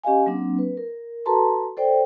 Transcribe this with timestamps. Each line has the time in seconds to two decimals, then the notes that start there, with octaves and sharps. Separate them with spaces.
0.04 C#4 G4 D#5 F5 G#5
0.26 F#3 A#3 C4 D4
0.58 B4
0.77 A#4
1.26 F#4 A4 B4 A5 A#5 C6
1.77 A4 C5 D5 G5